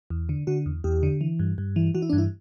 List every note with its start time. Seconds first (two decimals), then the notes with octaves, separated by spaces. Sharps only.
0.10 E2
0.29 D3
0.47 D3 F#4
0.66 E2
0.84 E2 G4
1.03 D3
1.21 E3
1.39 G2
1.58 G2
1.76 E3
1.95 E3 F#4
2.02 E4
2.10 D4
2.13 G2
2.18 E4